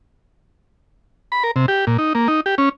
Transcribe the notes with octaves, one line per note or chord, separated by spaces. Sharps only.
B5
A#4
C3
G4
A#2
D#4
A#3
D#4
G4
C#4